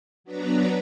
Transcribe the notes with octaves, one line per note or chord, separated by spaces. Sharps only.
F#3 B3 D4 B4 A#5